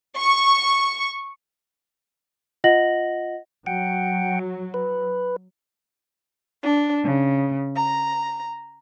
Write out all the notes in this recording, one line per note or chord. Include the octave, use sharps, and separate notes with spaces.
C#6
F4 D#5 F#5 A#6 F#7
F#3 F#5 G5
B4
D4
C#3
A#5